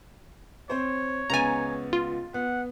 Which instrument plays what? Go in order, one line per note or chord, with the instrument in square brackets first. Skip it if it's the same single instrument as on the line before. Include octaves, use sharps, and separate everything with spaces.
[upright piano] C4 C5 [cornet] C#5
[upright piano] C#2 B3 A6 [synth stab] G#5 A#5
[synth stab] F4
[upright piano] B3 [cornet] F#5